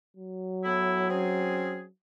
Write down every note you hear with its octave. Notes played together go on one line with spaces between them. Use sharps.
F#3
A2 B3 E4
C4 C#4 G#4